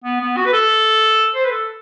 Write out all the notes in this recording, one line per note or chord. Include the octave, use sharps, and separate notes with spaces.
B3
B3
F#4
B4
A4
C5
B4
A4